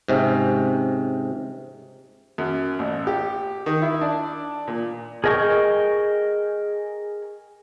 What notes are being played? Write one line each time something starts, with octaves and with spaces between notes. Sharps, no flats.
G#2 C3 C#4
F#2
A1
G4
D#3
E4
D4
A#2
G#4 A#4 D#5 G5 C#6